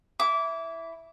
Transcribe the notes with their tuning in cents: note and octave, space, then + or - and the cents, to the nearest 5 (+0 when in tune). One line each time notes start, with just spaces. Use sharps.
E4 +0 D6 -25